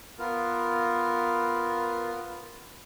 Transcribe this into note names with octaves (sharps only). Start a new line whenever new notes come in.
B3 F4 A#4